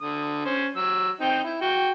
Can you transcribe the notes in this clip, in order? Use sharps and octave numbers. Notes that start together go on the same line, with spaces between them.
D3 D#6
C#4 C5
F#3 E6
C4 D#4 G5
E4
F#4 G5